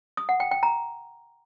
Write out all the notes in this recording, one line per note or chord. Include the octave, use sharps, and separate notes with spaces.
D#6
F#5
G5
G5
A#5